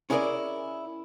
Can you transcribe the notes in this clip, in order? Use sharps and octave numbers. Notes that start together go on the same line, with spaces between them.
C#4 E4 G#4 A#4 B4 D5